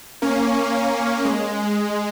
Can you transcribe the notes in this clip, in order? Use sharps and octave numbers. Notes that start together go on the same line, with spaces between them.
A#3 C#4
A#3
G#3